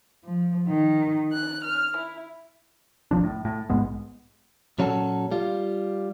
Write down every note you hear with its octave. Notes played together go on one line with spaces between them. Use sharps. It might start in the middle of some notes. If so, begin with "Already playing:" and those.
F3
D#3
F#6
F6
E4
F#1 F#2 F3 D4
A2
A2
A#1 G#2 G#3 B3
A#2 F#3 C#4 E4 F#4 A4
G3 F4